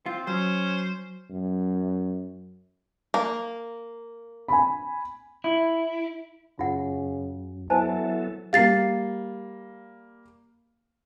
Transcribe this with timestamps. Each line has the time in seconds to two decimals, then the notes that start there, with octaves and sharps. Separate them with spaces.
0.06 C4 F4
0.27 F#3 C#4 C5
1.30 F#2
3.14 A#3
4.48 G#5 B5
5.44 E4
6.59 F#2 C#3 F4 F#5
7.70 F#3 B3 E4 A4 C5 G#5 A5
8.53 G3 A#3 F5 A6 C7